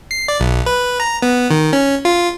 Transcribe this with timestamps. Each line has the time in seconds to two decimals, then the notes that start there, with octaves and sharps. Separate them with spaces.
0.11 C7
0.28 D5
0.40 B1
0.66 B4
1.00 A#5
1.22 B3
1.50 D#3
1.73 C#4
2.05 F4